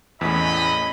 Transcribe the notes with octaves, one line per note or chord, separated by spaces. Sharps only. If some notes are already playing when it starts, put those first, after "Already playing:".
E2 A2 A3 C#4 D#5 B5